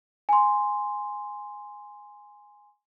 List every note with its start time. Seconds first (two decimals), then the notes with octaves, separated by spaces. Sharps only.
0.29 G#5 C6